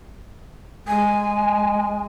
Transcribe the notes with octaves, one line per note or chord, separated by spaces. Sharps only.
G#3 G#5